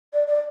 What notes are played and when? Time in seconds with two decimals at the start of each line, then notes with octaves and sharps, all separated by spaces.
0.13 D5
0.27 D5